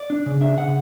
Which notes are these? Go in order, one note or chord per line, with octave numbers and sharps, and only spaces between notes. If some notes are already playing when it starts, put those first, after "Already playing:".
Already playing: D5
D4
C#3
D4 E5
C#3 F#5